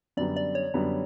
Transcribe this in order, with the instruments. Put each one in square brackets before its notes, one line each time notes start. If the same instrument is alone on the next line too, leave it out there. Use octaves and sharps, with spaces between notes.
[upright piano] F#2 D3 G3 B3 [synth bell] D5
[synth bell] D5
C#5
[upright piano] F#2 D3 G3 B3